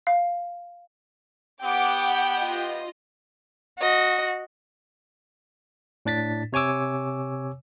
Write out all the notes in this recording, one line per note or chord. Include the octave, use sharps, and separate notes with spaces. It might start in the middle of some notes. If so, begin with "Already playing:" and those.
F5
B3 G4 F#5 G5 D6
F4 D#5
F#4 D#5
A2 D4 A6 B6
C3 C#5 G#5 D6 E6